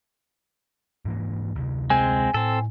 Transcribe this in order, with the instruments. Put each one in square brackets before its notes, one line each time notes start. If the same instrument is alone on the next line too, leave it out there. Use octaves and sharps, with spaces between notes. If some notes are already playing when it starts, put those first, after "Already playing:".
[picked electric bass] G#2 E3 A#3
D2 C3
[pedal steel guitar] G#3 C4 [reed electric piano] G#5
[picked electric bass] A2 [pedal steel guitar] C4 A4